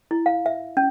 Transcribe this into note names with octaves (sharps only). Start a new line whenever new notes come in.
E4
F5
E5
C#4